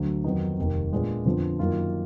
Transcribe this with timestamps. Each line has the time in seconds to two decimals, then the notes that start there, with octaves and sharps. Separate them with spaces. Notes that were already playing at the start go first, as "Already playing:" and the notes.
Already playing: D2 D3 F#3
0.24 F2 D#3 F#3 B3 D#4
0.58 F1 D#2 D#3
0.92 A#2 G#3 B3 D4 F4
1.25 F2 D3 F3 B3
1.59 F#2 D#3 A#3 F4